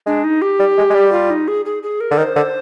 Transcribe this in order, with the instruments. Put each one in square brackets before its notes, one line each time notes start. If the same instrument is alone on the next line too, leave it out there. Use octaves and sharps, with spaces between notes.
[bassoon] G#3 [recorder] D4
[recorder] D#4
G4
[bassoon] G3
G#3
G#3
G3
[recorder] F4
D#4
G#4
G#4
G#4
A#4
[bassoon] D3
[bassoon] D#3 [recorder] D5
[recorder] C5
[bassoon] D3